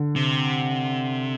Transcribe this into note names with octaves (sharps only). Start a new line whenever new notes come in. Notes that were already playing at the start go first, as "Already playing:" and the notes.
Already playing: D3
C3